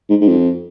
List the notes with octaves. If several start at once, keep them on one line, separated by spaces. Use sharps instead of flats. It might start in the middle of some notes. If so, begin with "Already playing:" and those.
G#2
G#2
F2